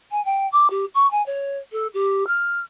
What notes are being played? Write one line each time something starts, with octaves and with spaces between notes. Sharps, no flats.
G#5
G5
D6
G4
C#6
G#5
C#5
A4
G4
F6